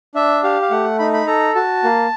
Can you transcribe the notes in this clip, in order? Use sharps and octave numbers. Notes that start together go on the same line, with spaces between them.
D4 E5
G4 F5
F5
A3 F#5
D#4 B5
B5
A4 A#5
F#4 A5
A#3